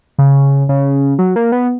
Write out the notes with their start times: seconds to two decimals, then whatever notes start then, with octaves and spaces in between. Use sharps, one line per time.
0.18 C#3
0.69 C#3
1.19 F#3
1.36 A#3
1.52 B3